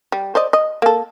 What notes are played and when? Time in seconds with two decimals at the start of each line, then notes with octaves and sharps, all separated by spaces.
0.12 G3
0.35 C5 D5 D#5
0.53 D#5
0.82 A#3 A4